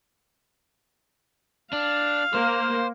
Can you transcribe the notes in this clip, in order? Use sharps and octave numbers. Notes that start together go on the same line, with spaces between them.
D4 F5
A#3 C5